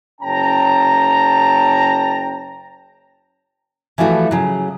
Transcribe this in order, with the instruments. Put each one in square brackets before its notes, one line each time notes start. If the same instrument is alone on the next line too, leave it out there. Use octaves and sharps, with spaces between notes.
[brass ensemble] F#1 C#4 G5 A5 A#5
[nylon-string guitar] E3 F3 G3 A3 F#4
C#3 F#3